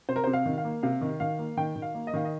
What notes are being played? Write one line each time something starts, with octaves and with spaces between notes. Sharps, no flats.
C3 C5
A#4
C3 C5
F5
D#3
F5
A#3
C3 F5
D#3
D#3 F5
A#3
D#3 G5
D#3
F5
A#3
D#5
D#3 F5
D#5